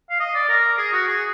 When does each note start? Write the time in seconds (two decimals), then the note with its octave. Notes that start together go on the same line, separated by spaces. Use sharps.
0.10 F5
0.20 D#5
0.35 D5
0.49 A#4
0.78 G#4
0.93 F#4
1.08 G#4